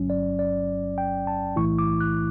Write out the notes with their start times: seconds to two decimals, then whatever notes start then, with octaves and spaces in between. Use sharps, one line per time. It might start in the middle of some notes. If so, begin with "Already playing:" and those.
Already playing: G1 G2 F#3 C#4
0.10 D5
0.39 D5
0.98 G5
1.27 A5
1.56 B1 A2 E3 A3 E4 C#6
1.79 D6
2.01 F#6